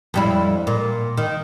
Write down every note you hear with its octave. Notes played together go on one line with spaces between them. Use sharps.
F2 G3 E4
A#2
D#3